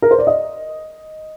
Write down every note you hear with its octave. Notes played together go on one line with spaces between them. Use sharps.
A#4
C5
D5
D#5